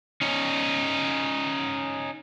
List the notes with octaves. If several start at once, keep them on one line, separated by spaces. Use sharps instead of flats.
C#4 D#4